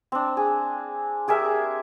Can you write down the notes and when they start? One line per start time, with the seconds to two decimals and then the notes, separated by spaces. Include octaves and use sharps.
0.12 C4 D4
0.37 G#4
1.28 G4 G#4 A#4 E5